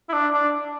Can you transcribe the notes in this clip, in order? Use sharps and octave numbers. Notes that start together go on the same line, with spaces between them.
E4
D4
D4